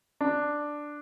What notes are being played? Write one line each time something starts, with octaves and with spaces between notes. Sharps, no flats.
D4